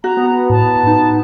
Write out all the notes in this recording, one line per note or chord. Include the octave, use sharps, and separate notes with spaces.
F#4 A#5
B3
A2 A5
D#4